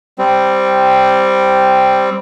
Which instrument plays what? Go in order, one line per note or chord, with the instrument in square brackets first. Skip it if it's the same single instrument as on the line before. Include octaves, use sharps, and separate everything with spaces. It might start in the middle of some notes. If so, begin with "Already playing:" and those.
[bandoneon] G3 C4